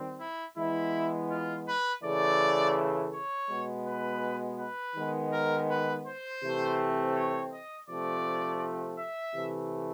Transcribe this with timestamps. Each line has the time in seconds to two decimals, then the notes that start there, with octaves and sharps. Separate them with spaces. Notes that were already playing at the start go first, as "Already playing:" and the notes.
Already playing: D#3 G3 C4
0.20 E4
0.57 E3 G#3 B3 E4
1.31 F4
1.67 B4
2.04 C#3 E3 A3 D5
3.14 C#5
3.50 B2 G#3 B3
3.87 B4
4.60 B4
4.96 D#3 G#3 B3
5.33 A#4
5.69 B4
6.07 C5
6.42 C3 E3 A3 C4
7.16 C#5
7.52 D#5
7.88 C3 F3 A3 C4 D5
8.99 E5
9.35 C3 E3 A3